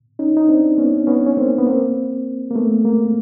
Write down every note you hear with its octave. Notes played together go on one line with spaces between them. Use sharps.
C#4 D#4
D#4
C4 D4
B3 C#4
B3 C#4
C#4
A#3 C4
B3
A#3 C4
A#3
A3 B3
G#3 A#3